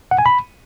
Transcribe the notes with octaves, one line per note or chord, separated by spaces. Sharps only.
F#5
G#5
B5